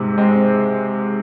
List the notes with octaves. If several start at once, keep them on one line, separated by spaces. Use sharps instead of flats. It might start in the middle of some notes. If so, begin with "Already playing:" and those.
Already playing: G#2 C3
G#3 C4